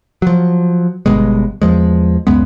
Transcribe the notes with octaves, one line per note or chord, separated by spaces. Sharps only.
F3 F#3
G1 G2 B2 G#3
E2 F3 G#3
C#2 F#2 G#3 B3